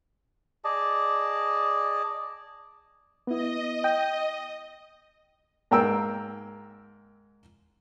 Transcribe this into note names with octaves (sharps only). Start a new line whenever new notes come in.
G#4 D5 D#5 A5
B3 E4 D#5
G5
G#2 A#3 A#4 G5 E6